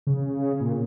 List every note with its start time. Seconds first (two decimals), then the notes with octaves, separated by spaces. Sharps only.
0.07 C#3
0.61 A#2